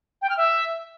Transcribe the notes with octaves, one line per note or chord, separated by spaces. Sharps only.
G5
F6
E5